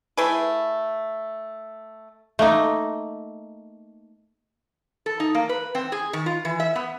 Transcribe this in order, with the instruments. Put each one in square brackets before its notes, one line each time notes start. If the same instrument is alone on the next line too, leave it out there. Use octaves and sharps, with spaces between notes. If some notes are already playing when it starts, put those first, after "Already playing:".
[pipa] A3 E4 G#4 B4
[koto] A3 A#3 D#4
[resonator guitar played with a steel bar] A4
D#4
A#3
B4
C4
G#4
D#3
F4
E3
E5
B3